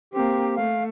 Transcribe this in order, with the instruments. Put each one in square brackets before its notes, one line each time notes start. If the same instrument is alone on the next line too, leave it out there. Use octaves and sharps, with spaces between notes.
[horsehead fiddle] A#3 C4 [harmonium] G4
[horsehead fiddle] A3 [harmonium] F5